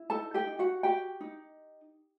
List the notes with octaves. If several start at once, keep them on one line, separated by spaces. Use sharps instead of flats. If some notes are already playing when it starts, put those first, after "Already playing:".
Already playing: E4
D#4 A4 A5
G4 G5
D#4
F#4 F#5
F#4 G4 G5
D#4